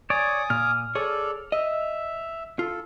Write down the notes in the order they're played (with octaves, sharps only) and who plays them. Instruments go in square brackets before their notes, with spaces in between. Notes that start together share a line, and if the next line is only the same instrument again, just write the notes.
[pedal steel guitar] C#5 D5 [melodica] G#5 D6 D#6
[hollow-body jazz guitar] A#2 [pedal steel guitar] F6
[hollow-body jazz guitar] G#4 C#5 [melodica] A4 D5
[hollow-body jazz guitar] D#5 [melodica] E5
[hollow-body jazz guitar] F4 [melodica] A4